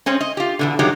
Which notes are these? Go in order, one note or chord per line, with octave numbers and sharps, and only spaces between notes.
G#3 C4 C#4
D#5
F4 G4
E2 B2 D3
G2 D#3 F#3 G#3 G4